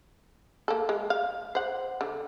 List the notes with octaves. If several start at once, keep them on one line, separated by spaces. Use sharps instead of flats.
A#3 A4
G#3
F5
C5 F#5
D3